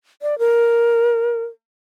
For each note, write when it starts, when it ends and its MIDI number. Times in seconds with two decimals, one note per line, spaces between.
0.22 0.38 74
0.39 1.44 70